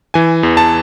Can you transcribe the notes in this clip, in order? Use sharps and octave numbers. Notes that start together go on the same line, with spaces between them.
E3 G#5
E2
A5